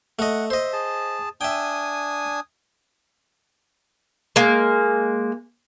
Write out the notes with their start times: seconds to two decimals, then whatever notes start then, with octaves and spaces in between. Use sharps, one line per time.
0.19 A3 D#5 F#5
0.50 C5 D#5 E5
0.73 G#4 A5
1.41 D4 E5 G5 G#5 D#6
4.36 G#3 A#3